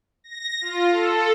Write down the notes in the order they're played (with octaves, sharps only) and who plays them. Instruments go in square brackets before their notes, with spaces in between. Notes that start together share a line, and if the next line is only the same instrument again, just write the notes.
[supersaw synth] A#6
F4
A4